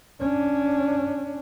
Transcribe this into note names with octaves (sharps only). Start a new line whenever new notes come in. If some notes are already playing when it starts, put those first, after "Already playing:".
C#4 D4